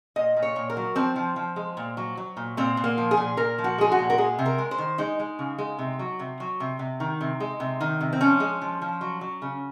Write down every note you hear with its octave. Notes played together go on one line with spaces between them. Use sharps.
A#2 D#5
A#2
C#5
A#2
A#4
F#3
F3 C4
F3
F3
G#3
A#2
F#3
F#3
A#2
A#2 C4
A#2
A#3
F3
G#4
A#2
A#2 A#4
F3
F#4
G#3 G#4
F#4
A#2
A#4
G#3 G#4
C3
A#4
G#3
C5
D#3
G#3 D#4
G#3
C#3
G#3
C3
F#3
C3
F#3
C3
C3
D#3
C3
G#3
C3
D#3
C3
C4
F3 C#4
G#3
F3
F3
F#3
F#3
C#3